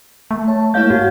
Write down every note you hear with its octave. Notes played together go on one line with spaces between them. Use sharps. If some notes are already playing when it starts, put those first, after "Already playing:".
A3
C#5 A5
G#3 A#3 E4 C#5 F5 G6
G#2 F#4